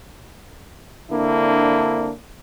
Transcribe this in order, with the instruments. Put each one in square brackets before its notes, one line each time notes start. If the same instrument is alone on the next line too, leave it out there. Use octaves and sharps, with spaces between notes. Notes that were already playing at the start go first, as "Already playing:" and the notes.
[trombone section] D3 A#3 C4 D4 E4